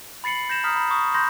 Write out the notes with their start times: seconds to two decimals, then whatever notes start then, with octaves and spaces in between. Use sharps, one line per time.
0.24 B5 A6 C7 C#7 F#7
0.49 G6 A#6 E7
0.64 A#5 D#6 F6 B6
0.76 B5
0.91 C#6 D#6
1.14 B5 C6 G6 A#6